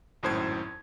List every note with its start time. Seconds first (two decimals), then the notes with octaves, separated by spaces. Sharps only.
0.23 G#1 F#2 A2 C5 A5 G#6